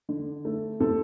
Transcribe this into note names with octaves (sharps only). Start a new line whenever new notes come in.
D3
A3
C3 A4